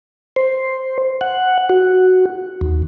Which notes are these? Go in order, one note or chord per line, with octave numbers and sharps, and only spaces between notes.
C5
F#5
F#4
D#2